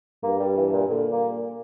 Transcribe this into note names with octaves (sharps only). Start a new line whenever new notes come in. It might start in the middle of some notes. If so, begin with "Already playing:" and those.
G2 A#3
G3
E3
A#2
A#2 D3
A#3